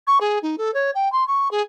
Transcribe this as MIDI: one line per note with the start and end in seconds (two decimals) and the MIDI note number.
0.07 0.18 85
0.21 0.39 68
0.43 0.56 63
0.58 0.73 69
0.74 0.91 73
0.95 1.11 79
1.12 1.26 84
1.28 1.51 85
1.51 1.62 68